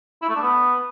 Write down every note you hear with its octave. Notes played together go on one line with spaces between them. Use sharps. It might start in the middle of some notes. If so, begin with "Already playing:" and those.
E4
A3
D4
B3